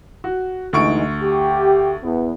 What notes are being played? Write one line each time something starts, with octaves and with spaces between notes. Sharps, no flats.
F#4
D2 E3 G#3 D#4 C#6 D7
G4
E2 B3